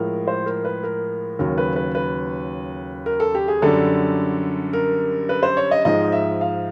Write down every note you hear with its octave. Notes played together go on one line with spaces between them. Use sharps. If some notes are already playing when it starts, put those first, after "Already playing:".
Already playing: A2 F3 G#3 A#4
C5
A#4
B4
A#4
D#2 C#3 F#3 A#4
B4
B4
B4
A#4
A4
G4
G#4
F#2 D3 G3 A4
A#4
B4
C5
C#5
D#5
G#2 F3 G#3 D#5
E5
F5